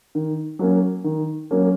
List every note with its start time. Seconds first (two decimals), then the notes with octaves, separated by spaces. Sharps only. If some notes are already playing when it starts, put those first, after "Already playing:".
0.15 D#3
0.59 F#3 A#3 C#4
1.04 D#3
1.51 F#3 A#3 C#4